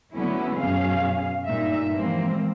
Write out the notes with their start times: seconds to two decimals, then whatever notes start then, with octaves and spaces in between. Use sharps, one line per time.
0.13 D3 F#3 A3 B3 C#4 E4
0.57 F#2 B2 C#4 G#4 F5
1.45 G2 A#2 D#4 E5
1.92 E3 F3 G3 G#3 A#3 C4